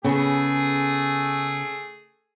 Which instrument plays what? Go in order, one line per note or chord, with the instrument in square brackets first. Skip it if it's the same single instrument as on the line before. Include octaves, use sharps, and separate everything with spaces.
[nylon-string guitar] C#3 B3 [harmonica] A3 G#4